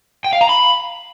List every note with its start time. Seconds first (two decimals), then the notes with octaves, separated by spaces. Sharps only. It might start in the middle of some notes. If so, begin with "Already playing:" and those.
0.24 G5
0.33 F5
0.41 A#5
0.49 B5